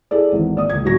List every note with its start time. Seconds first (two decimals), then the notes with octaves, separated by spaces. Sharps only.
0.11 E4 G#4 A4 D5
0.32 G#1 E2
0.56 A#3 D5 D#6
0.70 C#2 G#6
0.85 D#1 F#3 C#4 F#4 C#6 A#6